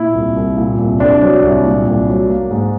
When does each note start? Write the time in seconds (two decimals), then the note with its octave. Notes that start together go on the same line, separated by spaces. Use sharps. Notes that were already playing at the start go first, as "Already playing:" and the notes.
Already playing: A#2 E4
0.15 C2
0.36 C2
0.57 A#2
0.78 C2
1.00 C2 D4
1.22 F#3
1.43 C2
1.65 A#2
1.87 C2
2.08 F#3
2.29 A#3
2.51 G#2